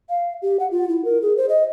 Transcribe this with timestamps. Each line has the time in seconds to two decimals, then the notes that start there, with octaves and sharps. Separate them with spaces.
0.09 F5
0.42 G4
0.60 F#5
0.71 F4
0.89 E4
1.05 A#4
1.22 G#4
1.37 C5
1.49 D#5